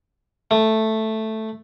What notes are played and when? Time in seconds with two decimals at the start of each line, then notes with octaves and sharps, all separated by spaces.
0.51 A3